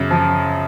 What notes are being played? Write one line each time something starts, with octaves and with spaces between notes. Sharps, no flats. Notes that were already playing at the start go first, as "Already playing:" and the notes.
Already playing: F#2 C#3
F3